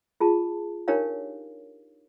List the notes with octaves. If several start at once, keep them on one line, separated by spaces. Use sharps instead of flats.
F4 G#4 A5
D4 D#4 G4 A#4 C#5 F5